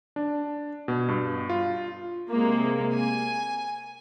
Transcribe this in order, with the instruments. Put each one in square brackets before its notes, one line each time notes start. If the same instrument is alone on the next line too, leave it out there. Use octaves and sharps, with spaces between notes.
[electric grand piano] D4
B2
G2
F4
[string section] C3 G#3 A#3
G#5